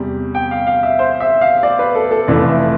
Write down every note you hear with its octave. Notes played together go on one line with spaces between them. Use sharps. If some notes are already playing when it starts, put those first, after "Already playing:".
Already playing: E2 C3 G3
G5
F5
F5
E5
C5
E5
F5
D5
B4
A4
A4
F1 F2 E3 A3 D5
E5